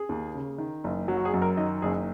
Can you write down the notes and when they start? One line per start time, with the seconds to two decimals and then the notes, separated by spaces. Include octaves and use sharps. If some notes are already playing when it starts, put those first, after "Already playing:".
Already playing: G#4
0.09 D#2
0.35 C#3
0.58 D#3
0.84 F#1
1.08 F#3
1.17 F#4
1.25 G#4
1.34 F#2
1.42 A#4
1.57 D#3 D#5
1.82 F#1 G#4